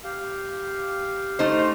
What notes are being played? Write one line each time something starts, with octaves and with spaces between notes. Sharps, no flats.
G4 F5
A3 D#4 C5